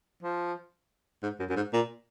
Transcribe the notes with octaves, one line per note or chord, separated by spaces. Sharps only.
F3
G#2
F#2
F#2
G#2
A#2